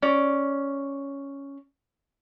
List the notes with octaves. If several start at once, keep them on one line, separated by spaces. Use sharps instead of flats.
C#4 D5